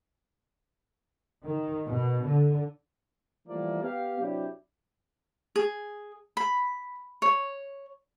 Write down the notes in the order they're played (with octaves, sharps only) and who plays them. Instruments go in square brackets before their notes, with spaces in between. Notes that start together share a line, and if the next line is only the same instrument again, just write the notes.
[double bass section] D#3
B2
D3
[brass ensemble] E3 F3 G3 A3 A#3 D5
B3 G4 F5
C3 F#3 D4 E4 G4
[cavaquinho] G#4
B5
C#5